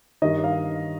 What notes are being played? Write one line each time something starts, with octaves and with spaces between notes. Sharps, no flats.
G2 D#3 D#5
F5